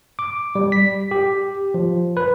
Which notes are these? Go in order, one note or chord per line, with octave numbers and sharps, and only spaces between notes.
D6
G3
B6
G4
F3
B4